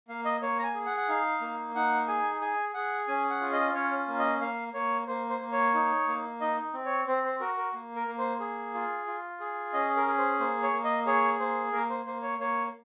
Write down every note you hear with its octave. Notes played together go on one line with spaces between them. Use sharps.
A#3 F5
D#5
A#3 C#5
A#5
G#5
G#4
F#5
F#5
D#4 F5
A#3
D#4 F#5
G#4 G#5
G#4 G#5
G#4 F#5
C#4 G#5
F#5
F4
D#5
C#4 C#5
A#3
D#5
A#3 F5
A#3 C#5
A#3 C5
C5
A#3
C#5
D#4
A#3
D#4 D#5
C4
C#5
C4 C5
C5
F#4 A#4
A#4
A#3
A#4
A#3
C5
G#4
F4
F4
G#4
C#4 D#5
A#4
G#4
C5
A#3 C5
C#5
A#3
D#5
G#4 C#5
A#3 C5
A#3 A#4
C5
A#3 C5
C#5
A#3 C#5